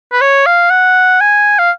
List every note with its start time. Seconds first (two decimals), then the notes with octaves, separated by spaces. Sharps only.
0.12 B4
0.21 C#5
0.46 F5
0.70 F#5
1.21 G#5
1.59 F5